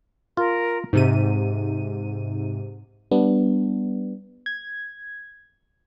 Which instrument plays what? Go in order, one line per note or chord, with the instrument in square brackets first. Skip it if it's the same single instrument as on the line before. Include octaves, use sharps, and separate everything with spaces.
[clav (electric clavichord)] F4 [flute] A#4
[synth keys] G#2 C3 D#7
[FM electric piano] G3 B3 D4
G#6